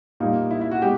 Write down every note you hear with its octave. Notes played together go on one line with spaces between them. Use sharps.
A#2 G3 A#3 D#4
E4
E4
F#4
B2 G#3 G4